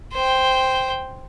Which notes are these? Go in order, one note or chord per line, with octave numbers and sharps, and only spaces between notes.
C5 G5